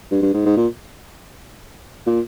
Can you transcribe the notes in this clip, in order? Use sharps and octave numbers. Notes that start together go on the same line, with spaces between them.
G2
G2
G#2
G#2
A#2
A#2